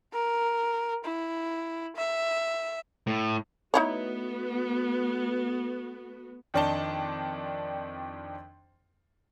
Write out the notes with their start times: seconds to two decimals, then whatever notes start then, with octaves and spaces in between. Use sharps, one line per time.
0.13 A#4
1.04 E4
1.96 E5
3.07 A2
3.74 A3 B3 D#4 E4 F#4 C#5
6.54 F2 D#3 D4 D#4 A5 G7